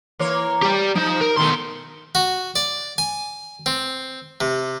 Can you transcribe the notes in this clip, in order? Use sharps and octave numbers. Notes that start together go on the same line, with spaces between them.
E3 A#3 C#5
G4 D5
F3 D#4 C5
A#4
B2 D#3 A3 C6
F#4
D5
G#5
C4
C3